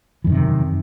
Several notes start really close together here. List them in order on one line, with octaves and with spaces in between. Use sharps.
E3 F#2 D#3 C3